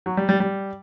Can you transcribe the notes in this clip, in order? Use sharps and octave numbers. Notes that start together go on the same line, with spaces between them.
F#3
G3
G3
G3